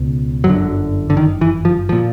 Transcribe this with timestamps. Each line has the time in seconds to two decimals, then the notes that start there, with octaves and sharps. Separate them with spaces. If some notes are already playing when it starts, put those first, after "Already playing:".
Already playing: C#2 B2
0.44 G1 F#2 D3 F#3
1.10 D3
1.17 D#3
1.41 E3
1.65 F3
1.89 A#2 F3